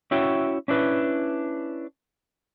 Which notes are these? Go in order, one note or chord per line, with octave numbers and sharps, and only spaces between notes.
C#4 E4 F#4 C#5 E5 G5
C#4 D4 E4 B4